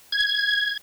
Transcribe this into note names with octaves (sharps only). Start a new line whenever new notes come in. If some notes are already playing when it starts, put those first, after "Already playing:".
G#6